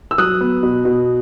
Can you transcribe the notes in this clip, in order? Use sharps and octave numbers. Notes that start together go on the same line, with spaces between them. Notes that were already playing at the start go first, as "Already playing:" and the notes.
E6
F#3 D#6 F#6
B3
B2
B2